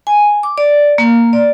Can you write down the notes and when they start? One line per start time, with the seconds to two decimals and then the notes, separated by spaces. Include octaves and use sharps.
0.07 G#5
0.43 D6
0.58 D5
0.98 A#3
1.33 D5